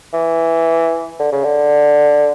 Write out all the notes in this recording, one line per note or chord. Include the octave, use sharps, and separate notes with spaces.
E3
D3
C#3
D3